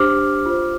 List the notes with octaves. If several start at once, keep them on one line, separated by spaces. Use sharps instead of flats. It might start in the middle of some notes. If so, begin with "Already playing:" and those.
Already playing: D4 G4 C5 D6 F6
F4 C5